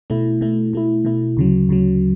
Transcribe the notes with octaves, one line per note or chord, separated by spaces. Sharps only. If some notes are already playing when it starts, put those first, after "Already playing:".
B2 A3 E4
B2 A3 E4
B2 A3 E4
B2 A3 E4
D2 C#3 F#3
D2 C#3 F#3